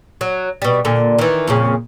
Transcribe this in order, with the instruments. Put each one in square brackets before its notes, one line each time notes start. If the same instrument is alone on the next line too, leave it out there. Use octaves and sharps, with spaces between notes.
[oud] F#3
B2 G3
A#2 D3
D#3 E3
F2 A#2 C#3